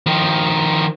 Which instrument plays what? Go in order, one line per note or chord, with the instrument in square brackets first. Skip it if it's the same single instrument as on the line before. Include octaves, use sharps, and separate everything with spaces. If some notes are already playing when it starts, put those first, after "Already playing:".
[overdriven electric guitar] D#3 F3